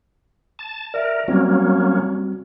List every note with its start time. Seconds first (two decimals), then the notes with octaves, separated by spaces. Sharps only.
0.59 A5
0.94 A#4 D5 E5
1.28 F#3 G3 A#3 C4 C#4 F#4